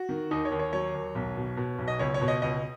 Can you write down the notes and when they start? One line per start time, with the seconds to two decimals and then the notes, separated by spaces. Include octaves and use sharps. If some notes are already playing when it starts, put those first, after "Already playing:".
Already playing: F#4
0.09 D#3
0.31 D#2 D#4
0.45 C#5
0.52 D#2
0.59 C#5
0.73 F#3 C#5
0.94 D#2
1.15 B1
1.37 B2
1.57 B2
1.78 B1
1.88 D#5
1.99 C#2 C#5
2.14 C#5
2.21 B2
2.28 D#5
2.42 C#2 D#5